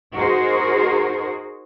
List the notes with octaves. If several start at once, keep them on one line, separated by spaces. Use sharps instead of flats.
D#4 F#4 G#4 A#4 C5